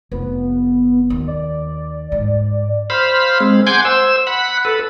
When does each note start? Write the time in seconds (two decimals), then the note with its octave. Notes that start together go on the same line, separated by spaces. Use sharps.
0.12 F1 B3
1.10 D#2
1.27 D5
2.12 G#2
2.90 C5 F5 B5
3.40 G#3 C4
3.67 F#5 G#5 C6 D6 G6 G#6
3.85 C5 E6
4.27 F#5 B5
4.65 A4 B4